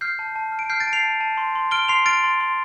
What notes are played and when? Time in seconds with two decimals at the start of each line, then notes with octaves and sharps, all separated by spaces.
0.01 F6 G6 C7
0.19 A5
0.36 A5
0.52 F6
0.59 D7
0.70 F6 G6 C7
0.80 A6 D7
0.87 A5
0.93 C7 F7
1.03 A5
1.21 A5
1.37 C6
1.55 C6
1.71 F6 D7 G7
1.88 C6 C7 F7
2.05 F6 A6 D7
2.24 C6
2.41 C6